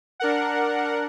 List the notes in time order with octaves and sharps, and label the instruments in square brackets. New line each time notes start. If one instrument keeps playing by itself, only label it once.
[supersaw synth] D4 A#4 F#5